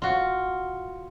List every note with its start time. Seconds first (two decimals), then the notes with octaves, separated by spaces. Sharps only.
0.02 F4 F#4